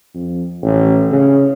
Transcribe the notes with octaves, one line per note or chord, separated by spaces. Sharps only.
F2
A1
C#3